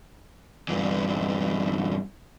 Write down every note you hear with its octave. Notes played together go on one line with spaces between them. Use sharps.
E2 G2